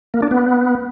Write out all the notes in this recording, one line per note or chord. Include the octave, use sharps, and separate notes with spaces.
A#3
D4
B3